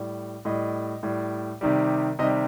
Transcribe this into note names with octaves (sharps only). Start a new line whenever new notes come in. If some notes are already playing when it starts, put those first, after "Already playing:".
Already playing: A2 G3
A2 G3 D#5
A2 G3
C3 D#3 G3
C3 D#3 G3 D#5